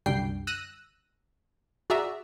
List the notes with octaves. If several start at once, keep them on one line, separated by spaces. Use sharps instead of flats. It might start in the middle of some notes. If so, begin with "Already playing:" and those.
C2 F#2 D3 G3 G5 C7
E6 F#6 A#6 D#7
F#4 G#4 D5 E5 A#5